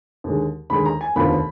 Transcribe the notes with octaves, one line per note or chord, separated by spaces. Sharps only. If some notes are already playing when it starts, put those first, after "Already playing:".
D#2 D3 G#3
D#2 D3 G#3 B5
A#5
G#5
F1 D#2 D3 F3 B3 B5